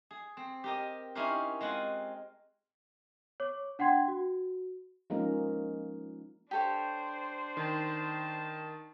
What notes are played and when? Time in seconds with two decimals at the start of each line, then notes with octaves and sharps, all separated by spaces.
0.11 G#4
0.37 C4
0.64 G4 A#4 D#5
1.15 C#4 D#4 E4 G4 A#4 C5
1.61 G#3 C4 F4 F#5 G#5
3.40 C#5 D6
3.79 D4 F#5 G5 C6 G#6
4.08 F#4
5.10 F3 G#3 A#3 C#4 D#4 A#4
6.51 D4 G4 A4 C5 C#5
7.57 D#3 A5